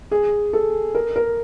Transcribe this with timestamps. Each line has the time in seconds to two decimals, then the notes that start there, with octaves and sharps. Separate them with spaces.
0.11 G#4
0.53 A4
0.95 A#4
1.16 A#4